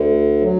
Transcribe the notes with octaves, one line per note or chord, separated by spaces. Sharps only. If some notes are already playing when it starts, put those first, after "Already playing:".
Already playing: D2 D3
F#3